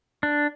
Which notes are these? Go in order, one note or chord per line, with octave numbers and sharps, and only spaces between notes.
D4